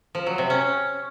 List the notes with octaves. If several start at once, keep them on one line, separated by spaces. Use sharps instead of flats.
F3
F#3
C3
C#4